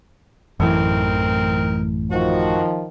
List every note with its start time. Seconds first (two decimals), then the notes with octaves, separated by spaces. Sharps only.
0.60 A1 F#2 A2 E3 C4 D#4 A#4
2.11 D#3 F3 F#4